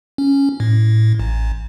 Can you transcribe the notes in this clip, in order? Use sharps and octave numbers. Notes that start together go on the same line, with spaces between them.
C#4
A2
A1